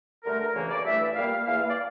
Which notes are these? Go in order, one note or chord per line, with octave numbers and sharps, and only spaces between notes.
G2 D3 A3 A#4
D2 C#3 E3 A#3 C#5
D5
G2 E3 A3 E5
A#2 G3 A#3 F5
E2 E3 A#3 F5
F5
D5